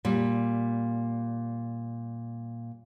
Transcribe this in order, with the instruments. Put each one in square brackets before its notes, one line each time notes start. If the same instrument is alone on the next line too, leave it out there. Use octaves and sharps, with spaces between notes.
[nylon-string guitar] A#2 G3